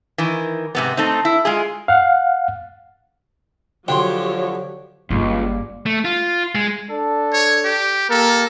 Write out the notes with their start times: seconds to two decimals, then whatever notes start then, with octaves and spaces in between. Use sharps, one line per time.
0.18 D#3 E3
0.75 G#2 C3 B3
0.97 A3 C4 D#4
1.25 E4
1.45 G#3 F4 G#4
1.88 F5 F#5
3.88 D3 F3 F#3 G4 C#5 G5 C6
5.10 G1 C#2 G3 A#3
5.86 A3
6.05 F4
6.55 G#3
6.91 D4 A4
7.33 C#5
7.64 G4
8.10 A#3 G4 A4 A#4